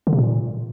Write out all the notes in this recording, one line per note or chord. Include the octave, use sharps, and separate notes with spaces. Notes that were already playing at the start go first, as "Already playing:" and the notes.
D3
C3
A#2